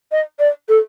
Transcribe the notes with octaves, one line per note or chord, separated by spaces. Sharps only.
D#5
D5
A4